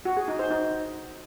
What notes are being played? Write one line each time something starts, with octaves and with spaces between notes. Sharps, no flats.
F#4
G#4
D#4
C5
D#4